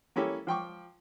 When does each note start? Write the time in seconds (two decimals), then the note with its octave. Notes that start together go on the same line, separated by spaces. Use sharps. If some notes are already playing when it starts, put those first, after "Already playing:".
0.16 A#3 C#4 E4 G4 A4
0.47 F3 G5 C#6 D6